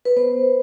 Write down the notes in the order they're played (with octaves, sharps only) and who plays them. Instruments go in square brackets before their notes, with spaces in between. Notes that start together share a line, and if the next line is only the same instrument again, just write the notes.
[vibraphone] B4
B3 C5